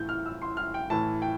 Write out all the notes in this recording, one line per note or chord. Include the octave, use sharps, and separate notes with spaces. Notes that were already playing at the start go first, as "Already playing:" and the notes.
Already playing: A2 E3 G6
F6
E6
C6
F6
G5
A2 E3 A5
G5